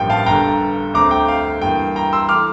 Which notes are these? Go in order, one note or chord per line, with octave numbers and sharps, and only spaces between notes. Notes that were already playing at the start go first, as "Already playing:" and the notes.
Already playing: A1 G2 F3 A#3 G5
F5 A5
G1 G2 D3 G5 A#5
D2 D3 A3 C4 A#5 D6
G5
F5
G2 E3 A#3 G5
G5 A#5
C6 E6
E3 A3 D6 F6